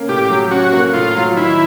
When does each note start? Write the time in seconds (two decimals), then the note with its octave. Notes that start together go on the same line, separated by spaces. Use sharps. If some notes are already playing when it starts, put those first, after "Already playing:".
Already playing: A#3 C#4
0.08 A2 G4
0.29 F#3
0.51 C#4 F#4
0.72 A#3
0.94 A2 F4
1.15 F#3
1.36 D#3 E4